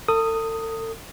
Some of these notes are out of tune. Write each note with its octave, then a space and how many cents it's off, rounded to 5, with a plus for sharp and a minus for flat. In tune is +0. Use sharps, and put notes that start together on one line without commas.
A4 +40 D#6 +0